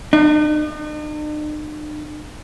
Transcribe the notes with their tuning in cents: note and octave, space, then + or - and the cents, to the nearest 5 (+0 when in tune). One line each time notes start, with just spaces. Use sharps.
D#4 -45